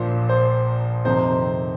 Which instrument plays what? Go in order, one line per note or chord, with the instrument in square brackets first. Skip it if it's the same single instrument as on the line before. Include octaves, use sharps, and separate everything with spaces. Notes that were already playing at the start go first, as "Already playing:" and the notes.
Already playing: [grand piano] A#1 A#2 F3 C5
C5
F2 C3 D#3 C4 D#4 C5